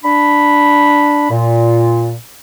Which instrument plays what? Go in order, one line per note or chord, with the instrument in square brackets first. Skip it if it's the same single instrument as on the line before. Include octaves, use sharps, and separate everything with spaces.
[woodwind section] D4 B5
A#2